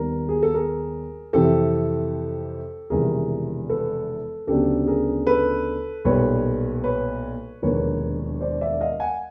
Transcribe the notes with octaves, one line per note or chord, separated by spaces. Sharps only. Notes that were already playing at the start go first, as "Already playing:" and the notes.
Already playing: D#2 D#3 G3 B3 A#4
G#4
A4
G#4 A#4
F2 C3 E3 G4 A4
E1 E2 C3 D#3 G3 G#4 A#4
A4 B4
D2 C#3 F#3 B3 D4 G4 A4
G#4 A#4
A4 B4
B1 A#2 G3 B3 B4 C#5
B4 C#5
E1 D#2 D3 F3 A#3 B4 C#5
C5 D5
D5 E5
D#5 F5
F#5 G#5